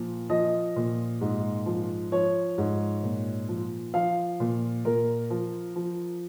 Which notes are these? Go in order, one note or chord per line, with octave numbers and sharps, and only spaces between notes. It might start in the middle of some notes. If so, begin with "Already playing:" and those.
Already playing: A#2 F3
F3 D#5
A#2
G#2
F3
F3 C#5
G#2
A#2
F3
F3 F5
A#2
A#2 A#4
F3
F3